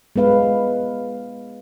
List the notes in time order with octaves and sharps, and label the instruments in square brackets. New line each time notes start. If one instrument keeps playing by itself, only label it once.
[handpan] G#3 B3 B4 F5